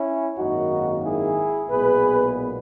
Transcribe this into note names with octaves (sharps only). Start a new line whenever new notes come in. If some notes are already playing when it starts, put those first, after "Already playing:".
Already playing: C#4 E4
G#1 F#2 D#3 A#3 D#4 F#4
E4 G#4
B1 A#2 G#3 B3 G#4 B4